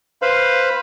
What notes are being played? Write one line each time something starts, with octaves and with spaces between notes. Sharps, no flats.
B4 C5 F5 B5